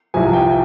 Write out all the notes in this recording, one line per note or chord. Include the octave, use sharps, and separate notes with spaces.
C2 C3 F3 G#5
G5